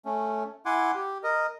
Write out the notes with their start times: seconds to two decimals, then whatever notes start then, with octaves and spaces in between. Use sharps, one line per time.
0.05 A3 C#4
0.66 E4 F#5 G#5 C6 D6
0.95 G4
1.24 A#4 D#5